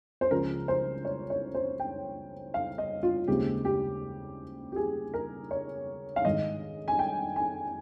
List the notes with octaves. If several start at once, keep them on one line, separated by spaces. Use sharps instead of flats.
C5
C#2 C#3 F3 A#4
C5
C#5
C#5
C5
G5
F5
D#5
F4
D#2 C#3 G#3 C4 G4
G4
G4
G#4
A#4
C#5
F5
G#2 D#3 G#3 D#5
G#5
G5
G#5